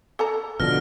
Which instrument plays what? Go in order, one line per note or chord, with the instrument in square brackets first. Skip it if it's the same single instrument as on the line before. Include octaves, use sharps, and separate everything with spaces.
[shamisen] A4 A5 A#5
[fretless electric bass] B2 D3 [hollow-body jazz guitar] F3 [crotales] F6 A#6